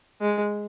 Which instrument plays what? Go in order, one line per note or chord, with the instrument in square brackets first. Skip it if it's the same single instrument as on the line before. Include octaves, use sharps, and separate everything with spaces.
[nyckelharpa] G#3